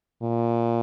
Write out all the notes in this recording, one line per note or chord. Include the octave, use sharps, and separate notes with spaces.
A#2